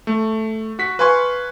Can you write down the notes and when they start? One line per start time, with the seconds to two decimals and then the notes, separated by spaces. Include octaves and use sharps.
0.07 A3
0.79 F#4 B6
0.99 B4 F5 G#5 C6 C#6